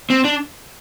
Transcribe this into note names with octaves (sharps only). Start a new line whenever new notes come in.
C4
D4